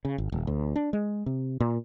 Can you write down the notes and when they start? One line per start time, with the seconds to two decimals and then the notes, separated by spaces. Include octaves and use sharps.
0.05 C#3
0.18 G#1
0.32 D#1
0.47 D2
0.76 D4
0.93 G#3
1.26 C3
1.60 A#2